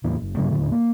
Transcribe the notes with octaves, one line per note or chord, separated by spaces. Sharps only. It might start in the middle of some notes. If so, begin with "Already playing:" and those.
E2 A2 E3 A#3
F#1
G2 C#3 F#3 A3
D#1 A2 D3
A#3